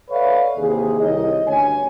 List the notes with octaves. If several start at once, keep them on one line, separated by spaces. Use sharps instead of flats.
A4 B4 C#5 D5 E5 F5
D#2 C3 E3 G#4
C2 D#3 D#4 C#5 D#5
D2 G2 C#4 C#5 G#5